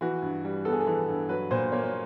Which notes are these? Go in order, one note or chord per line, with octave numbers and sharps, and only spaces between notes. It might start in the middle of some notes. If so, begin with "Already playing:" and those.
E3 F#4
G2
G3
B3 A4
G#4
A4
E3
G2
F#3 B4
A#2 C5
A#3 C#5
C#5